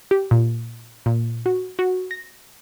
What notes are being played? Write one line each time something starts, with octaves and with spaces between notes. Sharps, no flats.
G4
A#2
A#2
F#4
F#4
A#6